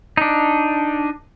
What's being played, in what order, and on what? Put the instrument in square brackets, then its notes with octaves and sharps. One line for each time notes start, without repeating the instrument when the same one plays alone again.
[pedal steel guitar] D4 D#4